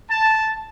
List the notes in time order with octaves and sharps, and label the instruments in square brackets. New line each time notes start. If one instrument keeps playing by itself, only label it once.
[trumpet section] A5